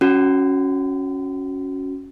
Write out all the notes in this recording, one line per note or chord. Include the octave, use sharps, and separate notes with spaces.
C#4 F#4